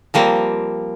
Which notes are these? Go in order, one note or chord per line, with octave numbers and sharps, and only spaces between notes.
F3 G3 A#3 C4